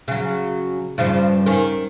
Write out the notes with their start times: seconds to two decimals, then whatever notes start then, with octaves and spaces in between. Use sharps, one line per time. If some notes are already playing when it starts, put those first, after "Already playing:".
0.08 C#3 F#3
0.98 G2 C#3 F3
1.46 D#3 C#4